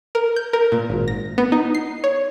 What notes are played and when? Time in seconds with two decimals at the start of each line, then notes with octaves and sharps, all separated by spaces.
0.15 A#4
0.36 G6
0.53 A#4
0.72 A#2
0.90 G#1
1.08 A#6
1.38 B3
1.52 D#4
1.75 C7
2.04 C#5